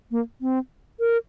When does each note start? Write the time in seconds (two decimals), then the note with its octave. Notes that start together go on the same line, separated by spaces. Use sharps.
0.11 A#3
0.41 C4
1.00 A#4